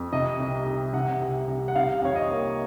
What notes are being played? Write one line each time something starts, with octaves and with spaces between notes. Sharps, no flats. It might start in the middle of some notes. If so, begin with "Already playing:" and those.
Already playing: F2
C3 D#5
C2
C2
C3 F#5
C2
C2
F#5
C3 F5
F2 C#5
D#5
A#3